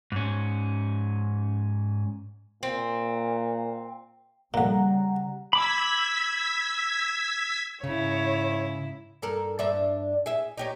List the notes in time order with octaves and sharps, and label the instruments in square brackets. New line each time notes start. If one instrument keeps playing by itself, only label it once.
[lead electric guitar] G#2 C#4
[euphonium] A#2 [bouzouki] C4
[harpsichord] F2 A#2 [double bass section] C#3 G3 [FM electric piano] F#5 A#5
[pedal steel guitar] B5 D6 [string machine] E6 G#6 B6
[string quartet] G#2 E4 [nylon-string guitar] C#3 [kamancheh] C#5
[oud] G2 A4 A#4
G2 D4 E5
G#4 E5
D#4 G4 C#5